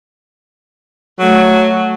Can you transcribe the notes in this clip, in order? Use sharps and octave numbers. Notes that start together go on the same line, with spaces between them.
F#3 A3